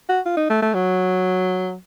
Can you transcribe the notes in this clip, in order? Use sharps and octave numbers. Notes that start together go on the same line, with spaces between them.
F#4
F4
D#4
A3
A3
F#3